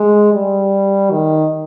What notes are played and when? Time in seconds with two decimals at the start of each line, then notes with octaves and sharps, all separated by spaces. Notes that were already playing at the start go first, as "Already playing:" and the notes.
Already playing: G#3
0.32 G3
1.11 D#3